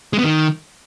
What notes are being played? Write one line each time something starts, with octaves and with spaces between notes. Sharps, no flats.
G#3
B3
D#3